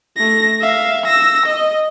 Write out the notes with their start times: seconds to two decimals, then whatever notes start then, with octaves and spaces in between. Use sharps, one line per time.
0.16 A3 A#6
0.61 E5 F5
1.06 E6 A#6
1.46 D#5